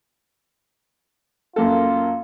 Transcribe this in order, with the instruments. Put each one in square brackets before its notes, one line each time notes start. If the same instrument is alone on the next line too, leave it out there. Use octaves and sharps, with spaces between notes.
[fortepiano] F#2 A#3 A4 [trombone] F4